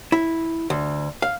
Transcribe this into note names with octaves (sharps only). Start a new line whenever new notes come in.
E4
D2
F5